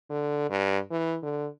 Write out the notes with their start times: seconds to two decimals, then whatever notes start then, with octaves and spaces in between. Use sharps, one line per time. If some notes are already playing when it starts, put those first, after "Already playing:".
0.10 D3
0.50 G2
0.91 E3
1.23 D3